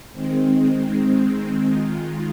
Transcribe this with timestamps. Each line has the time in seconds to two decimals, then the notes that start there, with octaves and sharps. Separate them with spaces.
0.13 D#3 G#3 C4
1.66 D#3 G#3 F4